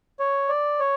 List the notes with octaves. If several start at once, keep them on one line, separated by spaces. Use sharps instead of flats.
C#5
D5
C#5